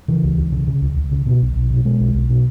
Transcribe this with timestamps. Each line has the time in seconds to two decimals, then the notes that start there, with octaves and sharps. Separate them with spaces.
0.08 C#3 E3
0.23 C#2
0.38 C#2
0.52 C#3
0.67 C#3
0.81 C#2
0.96 C#2
1.12 C#3
1.26 B2
1.41 B1
1.56 B1
1.71 B2
1.84 B2 G#3
2.00 B1
2.14 B1
2.30 B2